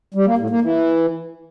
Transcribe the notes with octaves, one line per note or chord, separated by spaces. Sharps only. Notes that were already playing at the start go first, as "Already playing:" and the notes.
G3
A#3
A2
A#3
E3